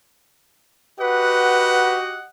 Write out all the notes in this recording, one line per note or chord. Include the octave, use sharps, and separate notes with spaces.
F#4 G4 B4 D#5 F#5